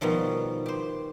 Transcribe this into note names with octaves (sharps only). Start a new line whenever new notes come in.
B2 D#3 F3 G3
G4 C5